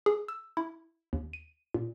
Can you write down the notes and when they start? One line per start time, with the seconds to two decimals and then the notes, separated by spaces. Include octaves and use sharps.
0.06 G#4
0.28 E6
0.57 E4
1.13 D#2
1.33 D#7
1.74 A#2